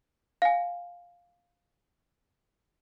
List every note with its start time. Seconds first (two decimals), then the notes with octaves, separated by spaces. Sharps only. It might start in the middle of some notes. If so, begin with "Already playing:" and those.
0.42 F5 G#5